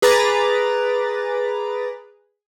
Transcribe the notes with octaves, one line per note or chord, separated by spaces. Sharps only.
G#4 B4 A#5 D6 A6